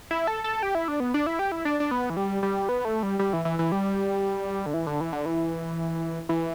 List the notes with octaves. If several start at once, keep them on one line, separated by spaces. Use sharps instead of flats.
E4
A4
A4
G4
E4
D4
B3
D4
E4
G4
E4
D4
D4
B3
E3
G3
G3
B3
A3
G3
G3
E3
E3
E3
G3
D3
E3
D3
E3
D3
E3
E3